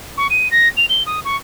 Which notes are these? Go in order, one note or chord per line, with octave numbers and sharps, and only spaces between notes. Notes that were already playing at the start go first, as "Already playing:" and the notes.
C#6
D#7
A#6
F7
G7
D#6
C#6